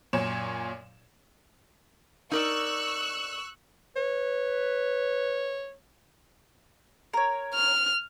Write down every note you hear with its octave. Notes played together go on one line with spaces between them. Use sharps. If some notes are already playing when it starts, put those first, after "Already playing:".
F#2 A#2 C#5 E7
D#4 A#4 D5 C#6 E6 F#6
B4 C#5
A#4 C#5
F6